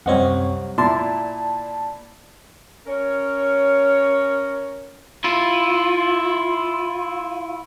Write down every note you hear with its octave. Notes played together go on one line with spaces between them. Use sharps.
C2 F#2 C4 C#5 D#5 F#5
A#2 E4 D5 A5 C6
C#4 A#4 C#5
E4 F4